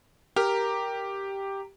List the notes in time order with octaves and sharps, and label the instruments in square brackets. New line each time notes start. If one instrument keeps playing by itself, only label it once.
[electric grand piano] G4 [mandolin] A#4